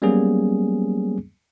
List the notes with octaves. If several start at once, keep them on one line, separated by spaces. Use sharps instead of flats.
F#3 G3 A#3 B3 C#4 G#4